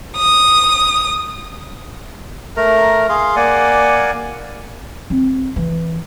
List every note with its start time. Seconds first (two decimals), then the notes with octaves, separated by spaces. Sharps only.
0.18 D#6
2.57 A3 A#4 A#5
3.09 G#4 F5 C6
3.36 A#3 D5 F#5 G#5
5.10 C4
5.56 E3